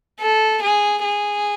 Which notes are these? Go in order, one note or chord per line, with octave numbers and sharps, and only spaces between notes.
A4
G#4
G#4